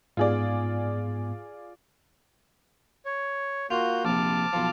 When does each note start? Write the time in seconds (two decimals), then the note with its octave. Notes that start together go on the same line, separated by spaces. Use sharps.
0.17 G#2 B3 F4 G#4 D5
3.06 C#5
3.71 A#3 F4 F#4 G6
4.05 A#1 C3 A5 D6 F6
4.53 B1 F3